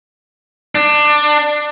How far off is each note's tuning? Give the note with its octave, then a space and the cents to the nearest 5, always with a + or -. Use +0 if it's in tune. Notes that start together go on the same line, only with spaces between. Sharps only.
D4 +20